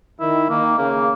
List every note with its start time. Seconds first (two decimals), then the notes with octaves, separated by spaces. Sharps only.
0.20 D#3 E4
0.49 D#3 A#3
0.78 C#3 A#3